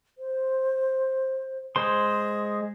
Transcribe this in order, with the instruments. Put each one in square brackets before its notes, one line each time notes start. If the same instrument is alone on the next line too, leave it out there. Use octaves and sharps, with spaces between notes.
[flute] C5
[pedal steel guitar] G#3 C5 C6 [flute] D#6